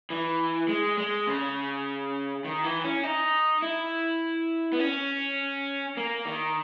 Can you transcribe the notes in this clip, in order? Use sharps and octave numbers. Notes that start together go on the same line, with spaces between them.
E3
G#3
G#3
C#3
D#3
E3
C#4
D#4
E4
B3
C#4
A#3
D#3